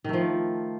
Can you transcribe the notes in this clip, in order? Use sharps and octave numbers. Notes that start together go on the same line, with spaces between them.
D#3 F3 A3